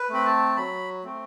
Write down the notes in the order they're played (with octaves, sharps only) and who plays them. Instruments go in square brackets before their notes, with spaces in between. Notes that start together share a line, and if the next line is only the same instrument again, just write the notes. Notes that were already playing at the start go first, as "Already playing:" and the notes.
Already playing: [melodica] B4
A3 C4 B5
A5
F#3 B5
A3 C4